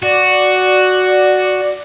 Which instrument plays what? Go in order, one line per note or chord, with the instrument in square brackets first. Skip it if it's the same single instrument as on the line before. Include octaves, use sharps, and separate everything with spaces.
[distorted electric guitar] F#4 [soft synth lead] D5